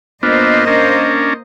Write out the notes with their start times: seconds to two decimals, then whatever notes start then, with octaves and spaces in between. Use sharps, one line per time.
0.23 A#3 B3 D4 F4 C5 D#5
0.67 C#4 D4 A#4